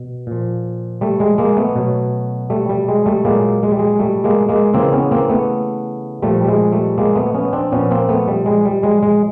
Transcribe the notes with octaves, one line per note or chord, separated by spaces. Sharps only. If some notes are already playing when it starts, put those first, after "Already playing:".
Already playing: B2
A#2 F3
G3 A3
G#3
G#3 A#3
A3 B3
B2 F#3
G3 A3
G3
G#3
G3 A3
A#2 F#3 G#3 A#3
G#3
G3
G#3
G3 A3
G#3 A#3
G#3 A#3
C#3 E3 A#3 C4
B3 C#4
A#3 C4
A3 B3
A#2 F3 G3 A3
G3
G#3
G3 A3
G#3 A#3
A3 B3
B3 C#4
C4 D4
A#2 F3 B3 C#4
A#3 C4
A3 B3
G3
G#3
G3
G#3
G#3